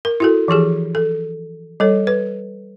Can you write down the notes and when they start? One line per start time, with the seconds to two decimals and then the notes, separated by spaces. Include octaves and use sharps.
0.05 A#4
0.20 E4 F#4 A4
0.48 E3 F3 G4 G#4
0.95 A4
1.80 G3 A4 C#5
2.07 B4